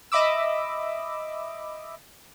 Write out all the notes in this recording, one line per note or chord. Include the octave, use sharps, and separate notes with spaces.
D#5 E5 B5 D6 E6